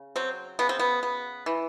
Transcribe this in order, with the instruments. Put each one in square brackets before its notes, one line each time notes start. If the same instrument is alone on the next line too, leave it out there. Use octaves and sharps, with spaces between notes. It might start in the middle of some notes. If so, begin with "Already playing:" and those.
Already playing: [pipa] C#3
F#3 C4
C#3 B3
C4
B3
B3
E3